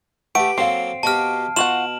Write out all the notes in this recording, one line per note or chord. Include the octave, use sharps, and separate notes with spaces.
A3 G4 B4 F#5 D7
F#3 A#3 C4 A4 F5 C7
B2 F#4 G4 A5 F6
B2 F4 F#4 F#5 E7 F#7